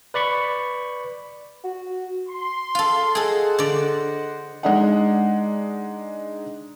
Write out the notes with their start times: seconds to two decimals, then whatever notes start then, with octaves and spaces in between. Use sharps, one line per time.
0.14 B4 D5 B5 C#6
1.64 F#4
2.29 C6
2.75 F4 A4
3.15 G#4 A4 C5 D#5 F#5
3.59 D3 D5
4.63 G#3 D4 D#4 D#5 F#5